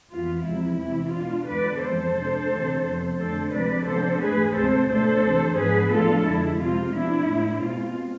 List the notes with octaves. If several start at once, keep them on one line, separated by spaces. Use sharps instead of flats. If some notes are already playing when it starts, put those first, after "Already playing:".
F2 E3 B3 F4
E2 C3 F3 G#3 E4
E2 C3 E3 E4
B2 G#3 D4 F4
E2 D3 G#3 B3 B4 D5
F2 E3 G#3 A4 C5
C3 G#3 D4
D2 C3 E3 A3 D4
F2 C3 F3 B3
F2 D3 A3 D4 A4 C5
D2 C3 F3 G#3 C4 B4 D5
C3 F3 B3 D4 A4 C5
G#2 E3 A3 G#4 B4
D2 C3 G#3 C4 A4 C5
B2 A3 D4 A4 C5
D2 C3 E3
G#2 F3 B3 D4 G#4 B4
A2 F3 B3 D4 F4 A4
F2 D3 G#3 E4
C3 G#3 C4 F4
C3 F3 B3 D4 E4
A2 G#3 D4
B2 G#3 C4 F4